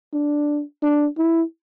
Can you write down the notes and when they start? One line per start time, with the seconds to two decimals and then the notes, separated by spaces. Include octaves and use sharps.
0.13 D4
0.83 D4
1.18 E4